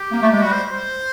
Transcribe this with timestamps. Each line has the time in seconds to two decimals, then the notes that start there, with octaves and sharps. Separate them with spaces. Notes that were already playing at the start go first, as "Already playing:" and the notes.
Already playing: G4
0.12 A#3
0.22 A3
0.32 G#3
0.42 G3 F#4
0.52 C5
0.72 C5